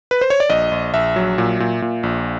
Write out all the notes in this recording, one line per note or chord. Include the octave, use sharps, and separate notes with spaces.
B4
C5
C#5
D5
A#1 D#5
A#1
A#1 E5
F#3
A#2
A#2
A#2
A#1